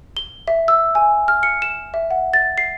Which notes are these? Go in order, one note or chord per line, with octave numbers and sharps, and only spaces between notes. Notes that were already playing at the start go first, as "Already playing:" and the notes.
G7
E5
E6
G#5
F6
C#7
E7
E5
F#5
A6
C7